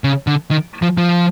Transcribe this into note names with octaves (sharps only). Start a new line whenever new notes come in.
C#3
D3
D#3
F3
F3